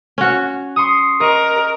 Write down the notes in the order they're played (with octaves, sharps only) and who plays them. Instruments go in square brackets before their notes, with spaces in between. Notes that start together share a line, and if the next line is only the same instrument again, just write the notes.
[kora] C#4 F#4
[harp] C6 C#6 D#6
[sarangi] A#4 [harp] D#5 C#6